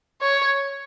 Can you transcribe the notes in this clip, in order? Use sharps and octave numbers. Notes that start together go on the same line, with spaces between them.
C#5